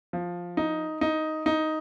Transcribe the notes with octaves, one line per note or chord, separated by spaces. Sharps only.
F3
D#4
D#4
D#4